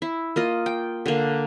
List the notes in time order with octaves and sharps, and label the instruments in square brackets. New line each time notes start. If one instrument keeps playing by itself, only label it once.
[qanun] E4
A#3 F4 D#5
G5
D3 A#3